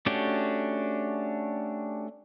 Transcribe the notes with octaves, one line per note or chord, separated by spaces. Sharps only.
A3 C#4 D4 F#4 G4